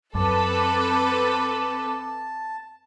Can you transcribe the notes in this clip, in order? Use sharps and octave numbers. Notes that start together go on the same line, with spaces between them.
F#2 C4 A4 B4 A5 D6